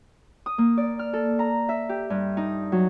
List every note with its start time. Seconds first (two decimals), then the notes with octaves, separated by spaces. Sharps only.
0.46 D#6
0.58 A#3
0.78 D5
0.99 F6
1.13 A4
1.39 A#5
1.69 E5
1.89 G4
2.10 G2
2.37 D#4
2.72 F#3